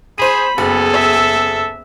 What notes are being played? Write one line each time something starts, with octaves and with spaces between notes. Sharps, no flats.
G#4 C5 B5 D#7
F#1 B3 G#4 A4
E5